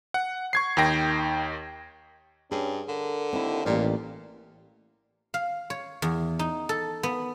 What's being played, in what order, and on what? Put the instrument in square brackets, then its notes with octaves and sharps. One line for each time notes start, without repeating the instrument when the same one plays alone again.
[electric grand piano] F#5
C#6 G#6 C7
D#2 D#3 G5 A#6
[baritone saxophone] G2 [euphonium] C#4 [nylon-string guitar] G#4
[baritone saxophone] D3 [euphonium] A#4
[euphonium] D#2 [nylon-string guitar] C4 E4
[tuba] A1 [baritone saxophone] A#2 [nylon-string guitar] A#3 G4 D5
[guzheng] F5
C#5
E2
D#4
A4
B3